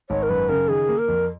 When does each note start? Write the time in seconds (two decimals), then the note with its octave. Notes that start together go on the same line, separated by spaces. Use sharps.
0.10 G#1 C#5
0.23 A#4
0.29 F#2 B4
0.49 C#3 A#4
0.68 D#3 G#4
0.89 A#3
0.98 A#4
1.08 F2